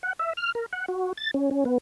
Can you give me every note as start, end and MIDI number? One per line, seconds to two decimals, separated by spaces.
0.03 0.13 78
0.19 0.33 76
0.37 0.52 89
0.55 0.66 70
0.73 0.86 78
0.88 1.13 66
1.17 1.31 93
1.34 1.51 61
1.51 1.64 61
1.65 1.78 59